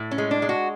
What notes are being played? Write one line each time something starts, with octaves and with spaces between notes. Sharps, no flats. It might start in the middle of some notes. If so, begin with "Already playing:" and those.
Already playing: A2
C#4
G#3
D4
G#3
F#4